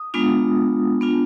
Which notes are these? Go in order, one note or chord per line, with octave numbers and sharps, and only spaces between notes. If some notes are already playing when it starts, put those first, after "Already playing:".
Already playing: D#6
G#3 B3 D4 F4
B3 D4 F4